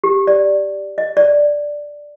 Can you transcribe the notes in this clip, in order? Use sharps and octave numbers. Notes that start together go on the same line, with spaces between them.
G4
D5
D#5
D5